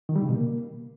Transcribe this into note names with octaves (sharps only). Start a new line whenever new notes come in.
D#3
G3
C#3
B2
A#3